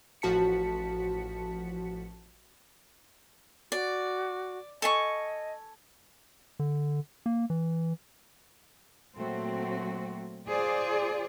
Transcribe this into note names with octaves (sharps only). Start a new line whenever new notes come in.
A1 F3 F#4 A5 B6 C#7
F#4 D5
A4 D#5 G#5 C#6
D3
A#3
E3
A#2 F#3 A3 C4 F#4
F4 G#4 C5 D5